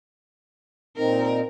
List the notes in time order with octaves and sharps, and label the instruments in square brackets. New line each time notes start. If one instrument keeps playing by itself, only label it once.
[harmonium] A#2 C4 D#4 [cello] A#4